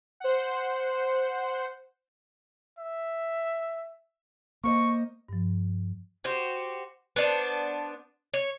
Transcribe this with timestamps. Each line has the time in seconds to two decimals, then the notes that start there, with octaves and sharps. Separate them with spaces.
0.20 C5 F#5
2.78 E5
4.64 A#3 C5 D#5 C#6
5.29 G2 F3
6.24 F#4 G4 C5
7.16 B3 D4 C5
8.34 C#5